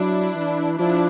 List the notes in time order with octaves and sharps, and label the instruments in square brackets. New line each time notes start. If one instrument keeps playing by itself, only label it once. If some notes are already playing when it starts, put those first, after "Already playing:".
Already playing: [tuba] F#3 [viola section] D4 E4
[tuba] E3
[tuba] F3 [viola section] D4 E4